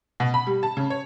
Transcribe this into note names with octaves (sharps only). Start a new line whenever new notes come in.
B2
B5
G3
A5
C#3
C#5